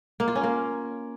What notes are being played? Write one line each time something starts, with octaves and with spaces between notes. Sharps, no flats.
A#3
F4
C#4
A#3